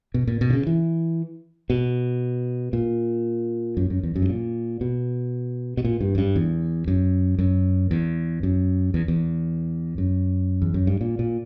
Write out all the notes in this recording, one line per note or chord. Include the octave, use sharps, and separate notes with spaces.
B2
A#2
B2
D3
C#3
E3
B2
A#2
F#2
F#2
E2
F#2
G2
A#2
B2
B2
A#2
G2
F#2
G2
E2
F#2
F#2
E2
F#2
E2
E2
F#2
E2
F#2
G2
A#2
A#2